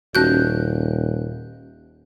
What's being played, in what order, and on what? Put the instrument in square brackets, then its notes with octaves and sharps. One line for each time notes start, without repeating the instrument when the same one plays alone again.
[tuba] D#1 [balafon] C#4 D#4 F#4 [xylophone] F#6 G6